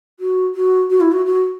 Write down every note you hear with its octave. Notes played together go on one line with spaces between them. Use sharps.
F#4
F#4
F#4
E4
F#4
F#4